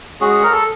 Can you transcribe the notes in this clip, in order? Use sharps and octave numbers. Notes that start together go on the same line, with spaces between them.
G#3 C#4 F#4 G#4
A#4
A4